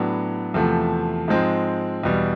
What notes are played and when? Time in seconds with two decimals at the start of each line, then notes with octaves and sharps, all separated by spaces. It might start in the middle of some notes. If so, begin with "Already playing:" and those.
Already playing: A2 F#3 B3 D4
0.54 E2 C3 F3 A3
1.28 G#2 F3 G#3 C4
2.03 E2 B2 G3